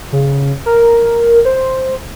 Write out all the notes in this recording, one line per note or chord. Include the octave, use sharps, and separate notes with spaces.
C#3
A#4
C5